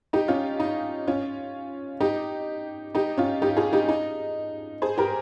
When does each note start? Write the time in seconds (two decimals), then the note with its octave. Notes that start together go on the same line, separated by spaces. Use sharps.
0.13 D#4 G4
0.28 C#4 F4
0.60 D#4
1.07 C#4 F4
2.01 D#4 G4
2.95 D#4 G4
3.18 C#4 F4
3.42 D#4 G4
3.57 F4 G#4
3.73 D#4 G4
3.88 D#4
4.82 G#4 C5
4.98 G4 A#4